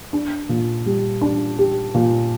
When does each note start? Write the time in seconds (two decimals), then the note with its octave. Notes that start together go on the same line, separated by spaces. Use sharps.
0.13 D4
0.49 A#2
0.86 G3
1.21 D4
1.58 G4
1.94 A#2